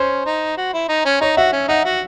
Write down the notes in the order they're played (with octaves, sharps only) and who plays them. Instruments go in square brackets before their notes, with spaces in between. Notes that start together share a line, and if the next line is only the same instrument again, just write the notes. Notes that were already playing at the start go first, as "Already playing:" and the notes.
Already playing: [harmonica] C#4 [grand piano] C5
[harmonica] D#4
F#4
E4
D#4
C#4
[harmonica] D#4 [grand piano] C#5
[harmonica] F#4 [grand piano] E5
[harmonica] C#4
[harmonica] D#4 [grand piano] F#5
[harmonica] F#4